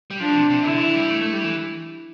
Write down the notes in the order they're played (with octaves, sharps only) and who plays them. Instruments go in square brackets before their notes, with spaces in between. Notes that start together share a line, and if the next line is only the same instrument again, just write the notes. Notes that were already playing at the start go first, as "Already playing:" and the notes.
[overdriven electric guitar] G3
[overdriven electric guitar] F3 [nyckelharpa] D4
[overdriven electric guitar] C3
C3
[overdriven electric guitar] D3 [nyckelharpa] E4
[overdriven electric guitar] E3
G3
A3
A3
G3
E3